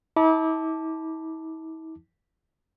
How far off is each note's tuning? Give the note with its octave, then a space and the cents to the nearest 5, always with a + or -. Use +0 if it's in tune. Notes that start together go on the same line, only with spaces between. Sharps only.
E4 -45 A5 +0 D6 +0